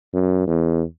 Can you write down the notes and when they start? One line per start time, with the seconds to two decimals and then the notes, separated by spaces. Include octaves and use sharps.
0.14 F#2
0.48 E2